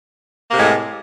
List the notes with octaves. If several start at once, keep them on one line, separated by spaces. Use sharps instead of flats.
A2 C3 G#3 A#3